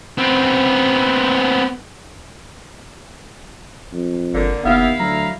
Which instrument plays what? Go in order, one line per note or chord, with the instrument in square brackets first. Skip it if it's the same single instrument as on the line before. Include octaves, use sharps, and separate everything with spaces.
[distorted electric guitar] B3 C4
[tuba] F2
[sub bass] G1 [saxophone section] D3 A#3
[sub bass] F1 [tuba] D#2 [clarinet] B3 [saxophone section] E4 F5
[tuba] D2 [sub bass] F#3 [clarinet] A#5